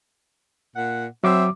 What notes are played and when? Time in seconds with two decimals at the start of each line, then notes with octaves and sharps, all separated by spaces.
0.74 A#2 F#5
1.24 F#3 C4 E5 D6